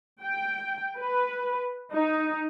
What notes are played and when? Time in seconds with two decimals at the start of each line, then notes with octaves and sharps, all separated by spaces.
0.23 G5
0.99 B4
1.93 D#4